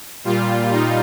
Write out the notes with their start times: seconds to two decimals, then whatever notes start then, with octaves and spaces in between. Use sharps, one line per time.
0.24 A#2 G3 F4
0.71 D#4